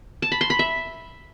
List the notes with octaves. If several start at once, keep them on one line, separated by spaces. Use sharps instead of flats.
A5
B5
C6
B5
E5